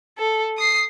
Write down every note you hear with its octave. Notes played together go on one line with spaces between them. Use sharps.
A4
D#6 C7